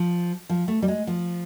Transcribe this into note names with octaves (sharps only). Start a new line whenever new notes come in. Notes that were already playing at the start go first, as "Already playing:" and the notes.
Already playing: F3
F3
A3
G3
G#3
F3